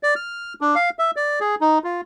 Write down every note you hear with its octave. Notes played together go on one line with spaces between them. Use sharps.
D5
F6
D4
F5
E5
D5
G#4
D#4
F4